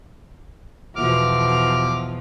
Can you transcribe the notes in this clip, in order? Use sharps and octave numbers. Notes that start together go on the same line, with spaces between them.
E2 B2 F3 D6 F6